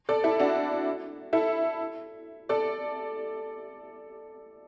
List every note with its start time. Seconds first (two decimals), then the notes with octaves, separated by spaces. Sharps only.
0.09 A4 D5
0.24 E4 A4
0.40 D4 F#4
1.33 E4 A4
2.49 A4 D5